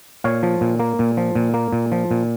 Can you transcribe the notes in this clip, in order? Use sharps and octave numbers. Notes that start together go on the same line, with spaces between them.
A#2 C#5 F5
F3
A#2
A#3
A#2
F3
A#2
A#3
A#2
F3
A#2